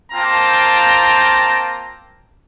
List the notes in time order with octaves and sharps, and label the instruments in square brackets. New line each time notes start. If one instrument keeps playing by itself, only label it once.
[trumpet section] A#3 C4 F4 G5 A5 A#5